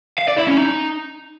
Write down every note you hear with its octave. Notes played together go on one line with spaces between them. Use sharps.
F5
D5
E4
C#4
D#4